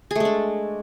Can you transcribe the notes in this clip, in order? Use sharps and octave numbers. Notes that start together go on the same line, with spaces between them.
G#3 A3 D4 G#4